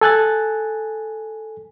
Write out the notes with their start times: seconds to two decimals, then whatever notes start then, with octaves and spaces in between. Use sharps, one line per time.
0.01 A4 G#5 F#6 A6